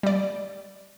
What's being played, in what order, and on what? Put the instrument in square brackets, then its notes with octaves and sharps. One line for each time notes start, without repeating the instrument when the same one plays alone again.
[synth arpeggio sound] G3 D5